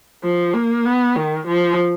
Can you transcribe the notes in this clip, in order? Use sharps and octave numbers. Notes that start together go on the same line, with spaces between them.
F3
A#3
B3
D#3
F3